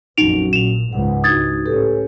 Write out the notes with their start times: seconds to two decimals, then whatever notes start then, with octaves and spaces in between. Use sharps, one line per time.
0.18 A#1 F2 F#3 C#4 D#4 F#4 D7 F7
0.53 A#2 E7 F7
0.93 C#2 G#2 F#5
1.24 D4 D#4 F#4 D#6 G#6 A6
1.66 A2 C#4 G4 A4 B4